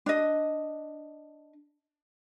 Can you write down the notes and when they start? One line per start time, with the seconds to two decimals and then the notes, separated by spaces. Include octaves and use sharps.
0.06 D4 D#5